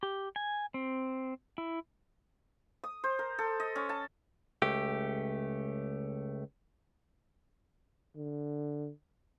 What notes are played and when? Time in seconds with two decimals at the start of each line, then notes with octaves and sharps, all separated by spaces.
0.03 G4
0.36 G#5
0.74 C4
1.58 E4
2.84 D#6
3.04 C5
3.19 A#4
3.39 A4
3.60 D#5
3.76 C#4
3.89 A5
4.62 C#2 A3 G4
8.16 D3